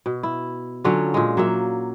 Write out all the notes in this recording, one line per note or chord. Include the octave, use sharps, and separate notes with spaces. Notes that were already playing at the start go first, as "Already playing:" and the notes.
B2
E4
D3 F#3 C#4 F4
A#2 G#3
F#3 A#3 E5